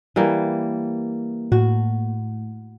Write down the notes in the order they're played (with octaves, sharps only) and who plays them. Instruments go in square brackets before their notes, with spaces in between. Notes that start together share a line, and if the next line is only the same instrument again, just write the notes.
[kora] E3 G3 A#3
[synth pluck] A2 [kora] F#4